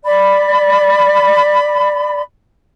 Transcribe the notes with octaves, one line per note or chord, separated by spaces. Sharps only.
D5 B5